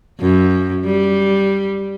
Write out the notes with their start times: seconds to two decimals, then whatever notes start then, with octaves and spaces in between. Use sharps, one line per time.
0.20 F#2
0.85 G3